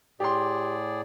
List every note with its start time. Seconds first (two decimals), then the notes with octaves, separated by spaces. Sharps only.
0.20 A2 G4 G#4 D5 C6